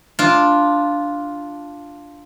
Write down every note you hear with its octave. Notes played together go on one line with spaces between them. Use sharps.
D4 F4